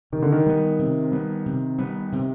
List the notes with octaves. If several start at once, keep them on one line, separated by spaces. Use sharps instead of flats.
C3 D#3
D3
D#3
G3 B3
C3
G3 B3
C3
G3 B3
C3